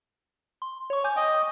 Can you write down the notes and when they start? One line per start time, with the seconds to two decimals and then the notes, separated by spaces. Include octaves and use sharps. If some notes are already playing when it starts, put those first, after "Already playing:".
0.62 C6
0.90 C#5 C#6
1.04 G#5 D6 G6
1.16 D#5 G5